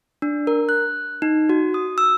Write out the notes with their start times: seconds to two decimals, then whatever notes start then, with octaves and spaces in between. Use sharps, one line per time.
0.22 D4
0.47 A#4
0.69 F#6
1.22 D#4
1.49 F#4
1.74 D#6
1.98 E6